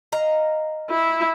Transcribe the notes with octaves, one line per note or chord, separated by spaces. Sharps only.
D#5 F5 A#5
E4